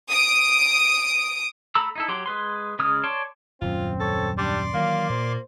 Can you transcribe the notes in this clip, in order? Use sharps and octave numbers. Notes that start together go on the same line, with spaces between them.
D#6 D7
A3 A4 A#5 B5 E6
D#4 E4 A4
F#3 G4 C6
G#3 B4 C6
C#3 G#3 D#6 F6
C#5 D5 A5 C6
D#1 F#2 C4 F4
A4 C#5
G3 D4 D5 C6 D6
D#3 E3 F#3 A#3 F5
A#2 C5